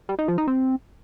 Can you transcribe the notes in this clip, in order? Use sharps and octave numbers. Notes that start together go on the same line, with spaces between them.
G3
D#4
F3
D#4
C4